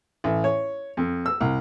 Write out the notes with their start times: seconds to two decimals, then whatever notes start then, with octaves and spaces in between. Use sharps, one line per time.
0.24 A1
0.44 C#5
0.97 F2
1.26 E6
1.41 C2